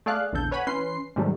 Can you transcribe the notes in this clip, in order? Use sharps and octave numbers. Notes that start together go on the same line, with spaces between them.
A3 G#4 D5 F5 F#6
A#1 E2 D3 A4 G6
B4 C#5 F#5 G#5 B5
E3 C#4 B4 C6 C7
G#2 C3 D#3 F#3 G3 A3